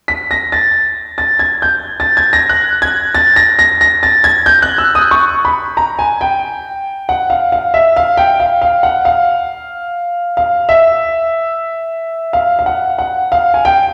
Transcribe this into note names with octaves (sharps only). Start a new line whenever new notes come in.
B6
A#6
A6
A6
G#6
G6
A6
G#6
A#6
F#6
G#6
A6
A#6
A#6
A#6
A6
G#6
G6
F#6
E6
D#6
C#6
B5
A#5
G#5
G5
F#5
F5
F5
E5
F5
G5
F5
F5
F#5
F5
F5
E5
F5
F5
F#5
F#5
F5
G#5
G5